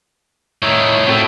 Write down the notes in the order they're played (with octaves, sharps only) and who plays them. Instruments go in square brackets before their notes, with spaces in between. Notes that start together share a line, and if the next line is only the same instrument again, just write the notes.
[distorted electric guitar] A2 D#3 [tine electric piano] C#5 E5 A#5
[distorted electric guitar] A2 [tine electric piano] C4 F#4 A4